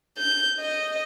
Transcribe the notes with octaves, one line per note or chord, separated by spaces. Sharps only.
G6
D#5